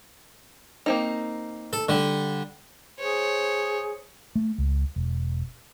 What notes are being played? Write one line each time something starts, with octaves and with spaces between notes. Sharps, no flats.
A#3 C4 D#4
A4
D3 G3
G#4 C5 C#5
A3
C#2
E1